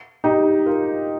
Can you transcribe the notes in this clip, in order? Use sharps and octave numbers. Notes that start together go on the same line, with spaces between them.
D#4 G4
F4 A#4